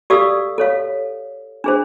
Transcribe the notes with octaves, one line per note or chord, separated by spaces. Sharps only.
G4 A4 D5 F5 D#6 E6
A4 C#5 F5
D4 G#4 C5